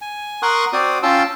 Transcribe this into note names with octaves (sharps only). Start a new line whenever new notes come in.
G#5
A#4 F#5 C6 C#6 D#6 F#6
C4 F#4 C5 D5 D#6
C#4 F4 G5 A5 C6 E6